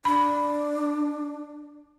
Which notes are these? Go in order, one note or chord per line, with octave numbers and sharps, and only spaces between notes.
D4 B5